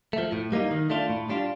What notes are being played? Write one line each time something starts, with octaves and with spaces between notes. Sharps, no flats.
F3 A3
A2
G3 A#3 D#4
D#3
A3 D4 F4
A2
G3 D4 F4